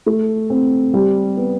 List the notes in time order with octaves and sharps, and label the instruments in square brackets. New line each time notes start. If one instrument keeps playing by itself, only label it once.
[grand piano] A3
C4
G3
B3